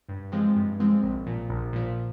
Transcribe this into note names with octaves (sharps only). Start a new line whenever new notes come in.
G2
F3 G#3 C4
G2
F3 G#3 C4
A#1
A#2 F3
A#1
A#2 F3